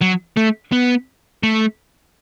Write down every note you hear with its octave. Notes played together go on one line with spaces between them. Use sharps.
F#3
A3
B3
A3